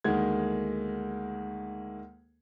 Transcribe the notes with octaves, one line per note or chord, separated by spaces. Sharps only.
D2 D#3 G#3 A#3 G#6